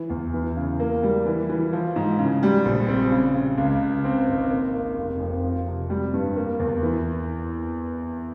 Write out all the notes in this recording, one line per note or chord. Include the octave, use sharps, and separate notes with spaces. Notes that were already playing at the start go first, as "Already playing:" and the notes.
Already playing: E3
E2
E3
C#3
A#3
G3
E3
E3
F3
G#2
C#3
G3
A#1
C4
C#3
C#3
C#2
C#3
C4
G#1
A#3
A#3
F1
F2
F3
C3
G3
G2
A#3
E2
E3